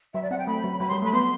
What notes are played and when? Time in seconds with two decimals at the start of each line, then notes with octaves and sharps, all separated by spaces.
0.14 F#3 E5
0.23 D5
0.31 C4 F#5
0.38 G5
0.47 A3 B5
0.64 F#3
0.80 F#3 B5
0.89 C6
0.91 G3
1.02 A3
1.05 B5
1.13 B3 C6